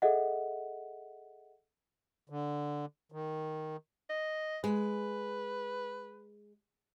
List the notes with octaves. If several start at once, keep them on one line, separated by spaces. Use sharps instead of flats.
G#4 A4 D#5 E5 F#5
D3
D#3
D#5
G#3 B4